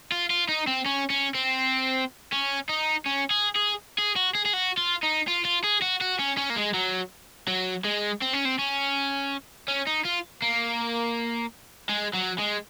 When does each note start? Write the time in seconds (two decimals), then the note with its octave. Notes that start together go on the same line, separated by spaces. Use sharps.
0.12 F4
0.30 F4
0.49 D#4
0.67 C4
0.86 C#4
1.10 C#4
1.35 C4
2.33 C#4
2.69 D#4
3.06 C#4
3.31 G#4
3.55 G#4
3.98 G#4
4.16 F#4
4.35 G#4
4.46 G#4
4.53 F#4
4.78 F4
5.03 D#4
5.28 F4
5.45 F4
5.64 G#4
5.82 F#4
6.01 F#4
6.19 C#4
6.37 C#4
6.50 A#3
6.56 G#3
6.74 F#3
7.48 F#3
7.85 G#3
8.22 C4
8.33 C#4
8.45 C4
8.58 C#4
9.68 C#4
9.87 D#4
10.05 F4
10.42 A#3
11.89 G#3
12.13 F#3
12.38 G#3